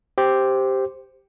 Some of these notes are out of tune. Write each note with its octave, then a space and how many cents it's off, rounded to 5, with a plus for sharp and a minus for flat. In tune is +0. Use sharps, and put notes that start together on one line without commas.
G4 +0 C5 +0